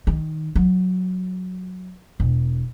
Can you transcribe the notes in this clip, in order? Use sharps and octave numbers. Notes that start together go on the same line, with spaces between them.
D#3
F#3
E1